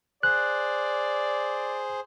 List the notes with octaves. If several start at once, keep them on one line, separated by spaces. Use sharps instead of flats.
G#4 C5 D5 F#6